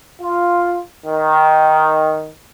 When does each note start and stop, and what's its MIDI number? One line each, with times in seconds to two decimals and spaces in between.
0.22 0.79 65
1.06 2.30 51